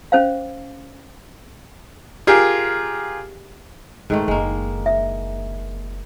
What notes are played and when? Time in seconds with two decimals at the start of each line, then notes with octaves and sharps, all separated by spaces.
0.12 C#4 C5 F5
2.27 F4 G4 G#4 A#4
4.10 G#1 G#2 D#3 A3
4.28 F#1 G#3 A#3 D4
4.86 E5